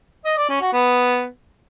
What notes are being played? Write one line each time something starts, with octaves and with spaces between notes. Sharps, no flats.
D#5
D5
C#4
F#4
B3